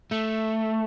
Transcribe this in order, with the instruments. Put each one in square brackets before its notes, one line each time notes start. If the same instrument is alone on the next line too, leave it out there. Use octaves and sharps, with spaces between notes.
[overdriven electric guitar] A3